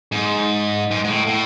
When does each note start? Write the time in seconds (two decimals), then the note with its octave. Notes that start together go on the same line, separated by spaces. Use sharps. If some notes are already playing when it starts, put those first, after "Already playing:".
0.12 G#2
0.91 G#2
1.04 G#2
1.09 A2
1.27 A2